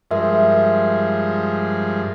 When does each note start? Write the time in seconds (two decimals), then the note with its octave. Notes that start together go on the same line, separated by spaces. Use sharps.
0.11 G2 F3 G#3 A#4 E5 C6